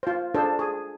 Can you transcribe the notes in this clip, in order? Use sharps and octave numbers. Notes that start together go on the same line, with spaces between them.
F4 C5
D4 F4 G#4 A4 C5
G#4